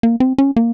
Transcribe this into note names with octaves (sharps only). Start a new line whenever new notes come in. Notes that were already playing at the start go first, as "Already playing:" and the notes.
A#3
C4
C#4
A#3